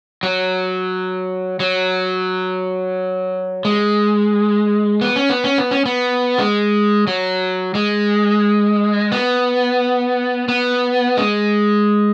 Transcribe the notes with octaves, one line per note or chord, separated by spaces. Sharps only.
F#3
F#3
G#3
B3
C#4
B3
C#4
B3
C#4
B3
G#3
F#3
G#3
B3
B3
G#3